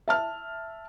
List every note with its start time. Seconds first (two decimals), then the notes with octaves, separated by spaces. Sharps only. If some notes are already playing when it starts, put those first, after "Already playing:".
0.08 E5 A5 F6